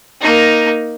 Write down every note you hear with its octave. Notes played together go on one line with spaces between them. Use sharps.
A#3 D#4